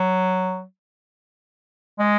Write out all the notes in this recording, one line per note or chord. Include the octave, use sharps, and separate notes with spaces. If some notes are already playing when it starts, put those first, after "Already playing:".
Already playing: F#3
G#3